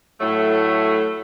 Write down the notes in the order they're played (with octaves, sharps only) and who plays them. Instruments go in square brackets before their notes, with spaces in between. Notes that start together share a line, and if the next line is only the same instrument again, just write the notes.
[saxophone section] A2 F#3 A3